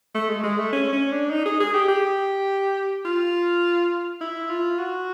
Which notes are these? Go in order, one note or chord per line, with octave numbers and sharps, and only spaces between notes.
A3
G#3
G#3
A3
C#4
C#4
D4
D#4
G#4
G#4
G4
G4
F4
E4
F4
F#4